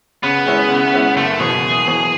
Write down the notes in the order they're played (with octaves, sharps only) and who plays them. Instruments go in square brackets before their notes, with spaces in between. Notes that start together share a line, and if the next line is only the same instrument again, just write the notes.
[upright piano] C#3 [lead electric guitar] B3
[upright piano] G#3 C#4 E4
C#3
G#3 C#4 E4
[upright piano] F#1 [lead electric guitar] A3
[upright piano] E2 B2 [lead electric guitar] G#4
[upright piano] F#1
E2 B2